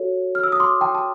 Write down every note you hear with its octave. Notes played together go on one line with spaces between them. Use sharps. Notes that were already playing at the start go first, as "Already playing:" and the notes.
Already playing: F#4 A4 C#5
F6
E6
D#6
C6 D6
G5 A5
A5